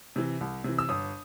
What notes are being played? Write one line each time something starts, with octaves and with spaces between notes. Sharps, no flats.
C3 E3
C2
C3 E3
E6
G1 D#6